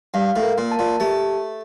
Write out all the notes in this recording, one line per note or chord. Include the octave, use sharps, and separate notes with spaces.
G2 F5
A2
A#4
A#2
A5
A#2
A3 G4